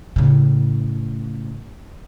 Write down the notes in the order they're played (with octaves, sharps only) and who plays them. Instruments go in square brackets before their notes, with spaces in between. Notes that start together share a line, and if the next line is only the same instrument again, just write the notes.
[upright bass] A2 C#3